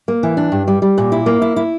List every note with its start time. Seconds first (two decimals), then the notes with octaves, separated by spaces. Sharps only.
0.08 A#3
0.23 E3
0.37 D4
0.52 G2
0.68 G3
0.82 G3
0.98 A#2
1.12 E4
1.26 A#3
1.42 E4
1.56 E4